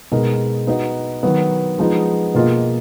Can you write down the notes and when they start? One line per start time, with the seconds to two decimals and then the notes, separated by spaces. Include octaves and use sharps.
0.12 B2 G#3 D#4 A#4 D#5
0.67 B3 D#4 F#4 B4 D#5
1.23 D#3 F#3 B3
1.78 F3 G#3 B3 D#4
2.34 B2 A#3 F4 G#4 D#5